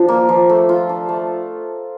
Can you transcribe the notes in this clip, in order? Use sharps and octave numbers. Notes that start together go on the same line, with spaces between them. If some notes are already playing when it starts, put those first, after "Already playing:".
Already playing: F3 D4 F4
A#3
F3
A3
F4
D4
A3